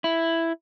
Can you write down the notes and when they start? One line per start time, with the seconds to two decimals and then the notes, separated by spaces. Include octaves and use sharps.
0.04 E4